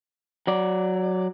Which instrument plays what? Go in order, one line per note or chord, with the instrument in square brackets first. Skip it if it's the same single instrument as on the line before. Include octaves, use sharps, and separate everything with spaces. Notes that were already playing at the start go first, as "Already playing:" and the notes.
[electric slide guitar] F#3 D5